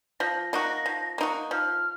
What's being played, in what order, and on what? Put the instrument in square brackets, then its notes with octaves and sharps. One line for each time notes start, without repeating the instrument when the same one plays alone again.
[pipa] F3 [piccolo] A#6
[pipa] A#3 D#4 F#4
F3
A#3 D#4 F#4
[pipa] F3 [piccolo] F6